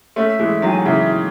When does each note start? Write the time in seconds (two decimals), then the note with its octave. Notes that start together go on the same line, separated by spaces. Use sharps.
0.16 A3 C#4 E5
0.39 E3 G#3
0.62 D#3 F#3
0.68 G#5
0.77 F#5
0.86 C#3 E3 E5